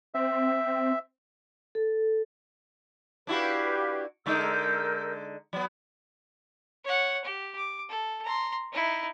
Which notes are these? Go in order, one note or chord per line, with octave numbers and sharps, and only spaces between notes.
C4 E5
A4
D4 E4 F#4 G4 B4 F5
D3 G#3 D#4 A#4 E6 G6
F#3 B3
C#5 F#5
G4
D6
A4
A#5 C6
D#4 E4